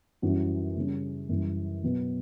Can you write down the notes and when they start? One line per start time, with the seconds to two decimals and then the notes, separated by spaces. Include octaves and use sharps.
0.22 F#2 E3 G3 C#4 F#4
0.76 C#3 G3 C#4
1.29 F#2 E3 G3
1.83 B2 F#3 B3